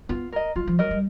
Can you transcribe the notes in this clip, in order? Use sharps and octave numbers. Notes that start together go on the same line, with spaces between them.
B3 F4
A#4 D#5
F#3 F4
F3
F#3 A#4 D#5
G3